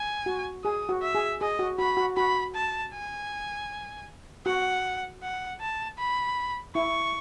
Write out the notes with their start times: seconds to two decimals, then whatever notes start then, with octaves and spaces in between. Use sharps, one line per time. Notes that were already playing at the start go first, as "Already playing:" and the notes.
Already playing: G#5
0.26 F#4
0.64 G#4 D#6
0.89 F#4
1.02 E5
1.15 G#4
1.41 G#4 D#5
1.59 F#4
1.79 F#4 B5
1.97 F#4
2.17 F#4 B5
2.54 A5
2.94 G#5
4.46 F#4 F#5
5.22 F#5
5.61 A5
5.98 B5
6.74 E4 C#6